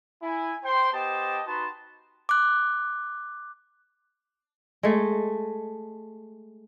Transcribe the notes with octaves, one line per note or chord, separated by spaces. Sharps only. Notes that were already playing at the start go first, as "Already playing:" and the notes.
E4 G#5
C5 G5 C6
B3 G4 C5 D#5 G5 A5
D#4 F#4 B4 A5 A#5 C6
D6 F#6
G#3 A3